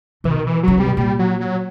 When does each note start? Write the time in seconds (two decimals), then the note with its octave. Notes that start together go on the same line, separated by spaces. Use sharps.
0.24 C3 E3
0.30 B2 D#3
0.47 E3
0.63 C#3 F#3
0.77 C3 G3
0.86 B2
0.97 A#2 G3
1.19 F#3
1.41 F#3